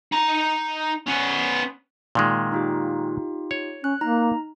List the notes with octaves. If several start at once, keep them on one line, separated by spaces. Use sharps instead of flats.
D#4 A#5
B3 C#4
A#2 D#3 G#3
D#4 F4 G4
C#5
C#4 F#6
A#3 D#4 A#5